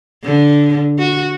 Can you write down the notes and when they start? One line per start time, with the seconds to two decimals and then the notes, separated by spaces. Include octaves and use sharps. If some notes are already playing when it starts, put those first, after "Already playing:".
0.24 D3
0.99 F#4